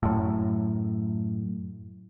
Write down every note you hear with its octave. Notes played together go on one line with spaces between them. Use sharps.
F#2 A2